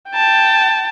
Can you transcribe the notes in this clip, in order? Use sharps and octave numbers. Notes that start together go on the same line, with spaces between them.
G5 A5